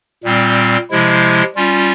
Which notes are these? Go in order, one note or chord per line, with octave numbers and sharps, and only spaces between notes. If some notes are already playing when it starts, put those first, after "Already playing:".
A#2 G3 C4
C3 F3 G#3 E4
G3 C#4 F4